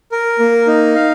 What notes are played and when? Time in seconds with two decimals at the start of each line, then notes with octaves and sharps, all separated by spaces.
0.12 A#4
0.39 A#3
0.67 D#4
0.95 F5